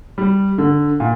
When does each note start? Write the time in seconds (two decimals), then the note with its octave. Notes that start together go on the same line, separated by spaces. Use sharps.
0.18 G3
0.58 D3
1.00 A#2